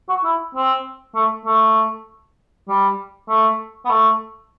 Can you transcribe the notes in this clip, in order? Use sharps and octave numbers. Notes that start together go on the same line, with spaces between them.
F#4
E4
C4
A3
A3
G3
A3
B3
A3